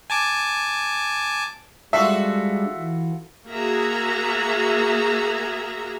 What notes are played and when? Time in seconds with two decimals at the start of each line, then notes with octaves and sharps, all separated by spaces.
0.10 G#5 A5 D6
1.93 G3 G#3 D4 F4 F#4 A4 E5
2.74 E3
3.50 A#3 F#4 G#4 E5 A#5